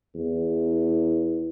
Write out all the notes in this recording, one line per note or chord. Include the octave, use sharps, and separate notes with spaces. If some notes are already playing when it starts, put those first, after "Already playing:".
E2